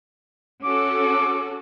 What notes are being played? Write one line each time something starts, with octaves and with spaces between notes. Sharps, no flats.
C#4 F#4 A4 D6